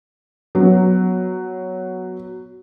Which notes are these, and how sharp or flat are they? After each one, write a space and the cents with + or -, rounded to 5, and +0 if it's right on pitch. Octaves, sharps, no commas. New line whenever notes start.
F#3 +0 B3 +0